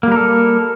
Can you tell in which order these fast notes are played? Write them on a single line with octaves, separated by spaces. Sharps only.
A#3 G3 A#4 A4